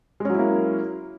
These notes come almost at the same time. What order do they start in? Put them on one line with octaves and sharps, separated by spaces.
G#3 C#4 F#3 E4 A#3